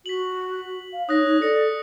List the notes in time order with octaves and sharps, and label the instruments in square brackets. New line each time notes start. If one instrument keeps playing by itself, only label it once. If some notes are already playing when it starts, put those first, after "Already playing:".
[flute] F#4 [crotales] B6 F#7
[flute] F5
[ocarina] D#4 [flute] C#5 [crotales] D#6 F#6 A#6
[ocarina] D#4
[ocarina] A4 [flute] D5 [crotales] A#6 C#7